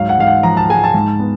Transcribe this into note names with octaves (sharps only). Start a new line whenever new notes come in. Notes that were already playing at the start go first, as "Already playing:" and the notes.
Already playing: G#2 F#3 F5
F#5
G#2 F5
F#5
F3 A#5
A5
G#3 G#5
A5
G#2
B3